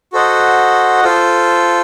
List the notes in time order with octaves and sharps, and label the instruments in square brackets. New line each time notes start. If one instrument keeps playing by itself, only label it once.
[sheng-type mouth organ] F#4 A4 C5 D#5 F#5
F4 A4 C5